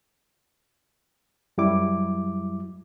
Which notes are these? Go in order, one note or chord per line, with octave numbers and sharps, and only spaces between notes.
F#2 F#3 G3 E4 D6